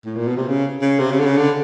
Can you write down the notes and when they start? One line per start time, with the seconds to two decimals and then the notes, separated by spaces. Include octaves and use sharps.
0.05 A2
0.16 A#2
0.27 B2
0.37 C3
0.48 C#3
0.82 C#3
0.99 C3
1.12 C#3
1.19 D3
1.25 C#3
1.37 D3